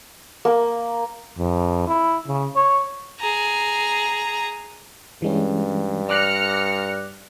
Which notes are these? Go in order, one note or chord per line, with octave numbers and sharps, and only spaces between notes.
A#3
F2
E4
C#3
C#5
G#4 A#5
G2 E3 G#3 C#4
D5 D6 F6 F#6 A#6 C#7